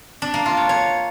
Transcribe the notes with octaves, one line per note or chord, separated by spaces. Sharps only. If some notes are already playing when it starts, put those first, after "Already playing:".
D4
A#3
F4
C#5
C#5